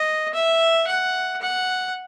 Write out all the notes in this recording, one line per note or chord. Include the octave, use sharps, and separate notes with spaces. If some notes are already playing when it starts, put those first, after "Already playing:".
Already playing: D#5
E5
F#5
F#5